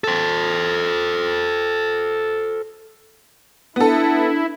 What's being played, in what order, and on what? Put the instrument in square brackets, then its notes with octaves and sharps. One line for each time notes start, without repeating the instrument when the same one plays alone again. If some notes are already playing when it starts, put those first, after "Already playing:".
[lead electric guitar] A4 C5
[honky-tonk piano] B3 A4 [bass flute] D4 [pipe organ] E4